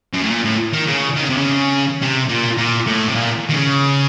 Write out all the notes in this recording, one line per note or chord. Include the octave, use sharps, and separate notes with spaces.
F#2
A2
A#2
A2
D#3
C#3
D#3
C#3
C3
C#3
C3
A#2
A#2
A2
C3
A#2
D#3
C#3